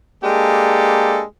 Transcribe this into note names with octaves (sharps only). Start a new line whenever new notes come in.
G#3 A#3 D4 G4 A4